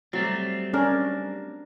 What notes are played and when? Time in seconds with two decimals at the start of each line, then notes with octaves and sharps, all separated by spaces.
0.13 F#3 G3 A3 C4
0.73 C#4 D4 A#4